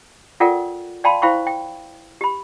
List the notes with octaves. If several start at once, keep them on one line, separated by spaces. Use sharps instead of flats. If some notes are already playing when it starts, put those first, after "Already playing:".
F4 A4 A#4 D5 F#5 G5
D5 F5 G5 A5 B5 C6
E4 C5 F5 G5 B5 C#6
G5
G4 B5